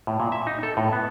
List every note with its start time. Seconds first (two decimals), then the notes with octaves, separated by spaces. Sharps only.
0.07 A2
0.20 A#2
0.32 E5
0.47 D#4
0.63 A4
0.77 A2
0.93 B3